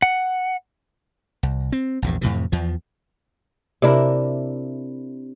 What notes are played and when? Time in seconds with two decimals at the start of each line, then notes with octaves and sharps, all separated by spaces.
0.02 F#5
1.43 C2
1.72 C4
2.02 A#1 E2 G2
2.21 F2 A2 C3 E3
2.52 E2 F3
3.82 C3 D4 E4 A#4